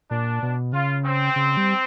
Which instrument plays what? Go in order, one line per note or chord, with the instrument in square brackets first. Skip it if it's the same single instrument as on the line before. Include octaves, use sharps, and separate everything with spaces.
[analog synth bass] A#2 [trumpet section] D4
[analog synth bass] B2
[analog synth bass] C#3 [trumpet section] F4
[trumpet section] C4
[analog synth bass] C#3
G3